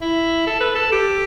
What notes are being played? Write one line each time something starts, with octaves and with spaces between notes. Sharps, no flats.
E4
A4
B4
A4
G4